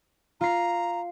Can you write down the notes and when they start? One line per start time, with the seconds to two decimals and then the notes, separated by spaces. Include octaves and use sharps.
0.41 F4 A#5 C7